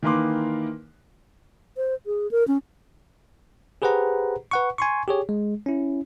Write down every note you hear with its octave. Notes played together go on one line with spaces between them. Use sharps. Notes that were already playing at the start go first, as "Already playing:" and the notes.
D#3 E3 A#3 B4 C6 D6
C5
G#4
A#4
C#4
G4 G#4 B4 C5 F#5 A#5
B4 F#5 C#6
G#5 C6 C#6
G4 G#4 C#5
G#3
C#4 E4